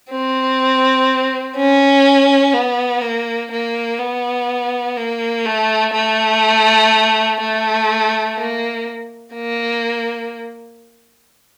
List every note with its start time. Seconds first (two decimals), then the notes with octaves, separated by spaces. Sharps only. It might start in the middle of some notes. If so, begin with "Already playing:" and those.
0.11 C4
1.56 C#4
2.54 B3
3.02 A#3
3.52 A#3
3.99 B3
4.97 A#3
5.46 A3
5.94 A3
7.40 A3
8.37 A#3
9.34 A#3